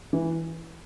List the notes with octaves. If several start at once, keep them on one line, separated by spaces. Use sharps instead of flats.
E3